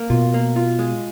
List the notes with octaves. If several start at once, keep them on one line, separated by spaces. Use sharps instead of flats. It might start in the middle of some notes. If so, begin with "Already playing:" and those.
Already playing: A#3
B2 F4
A#3
F4
G#3